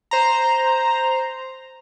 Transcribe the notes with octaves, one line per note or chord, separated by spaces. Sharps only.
C5 A#5